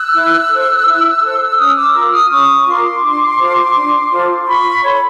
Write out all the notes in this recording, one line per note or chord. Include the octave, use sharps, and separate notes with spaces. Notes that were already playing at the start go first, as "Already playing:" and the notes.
Already playing: E6 F#6
E4
A4 C5
E4
A4 C5
C#4 D#6 F6
D6 E6
F4 A#4 D6 E6
D#6 F6
C#4 C#6 D#6
F4 A#4 C6 D6
D4
F4 A4 C5
D4
F4 A4 C5
F4 B5 C#6
A4 C#5 C6
B5